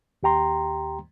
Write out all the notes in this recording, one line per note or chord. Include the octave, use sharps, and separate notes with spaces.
D#2 G4 G5 A#5 C6